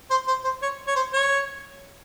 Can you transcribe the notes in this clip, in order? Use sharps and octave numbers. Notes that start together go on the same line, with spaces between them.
C5
C5
C5
C#5
C#5
C5
C#5